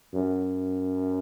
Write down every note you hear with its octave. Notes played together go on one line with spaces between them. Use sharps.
F#2